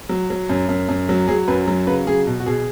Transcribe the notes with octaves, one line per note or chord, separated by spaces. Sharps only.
F#3
F#3
F#2
F#2
F#2
F#3
F#3 G#4
F#2 B4
F#3
C#3 B4
F#3 G#4
B2
F#4
B2 G#4